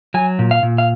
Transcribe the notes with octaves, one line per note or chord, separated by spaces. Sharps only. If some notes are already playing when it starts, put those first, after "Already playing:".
F#3 G#5
A#2
F5
A#2
F5